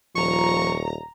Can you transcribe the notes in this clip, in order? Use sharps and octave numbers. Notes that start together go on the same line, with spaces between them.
D#1 F3 A#5 C#6